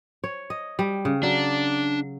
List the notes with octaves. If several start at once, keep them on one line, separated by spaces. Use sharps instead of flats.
C#5
D#5
G3
C#3
F#3 D4